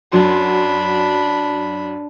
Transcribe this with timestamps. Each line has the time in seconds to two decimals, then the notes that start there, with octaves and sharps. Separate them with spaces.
0.12 F#2 F#3 D4 B5 C6